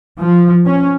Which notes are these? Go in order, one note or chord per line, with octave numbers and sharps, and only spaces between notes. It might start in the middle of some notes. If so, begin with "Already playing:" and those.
F3
C#4